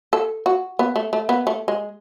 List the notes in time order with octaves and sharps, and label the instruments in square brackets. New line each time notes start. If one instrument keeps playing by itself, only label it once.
[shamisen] A4
F#4
B3
A3
A3
B3
A3
G#3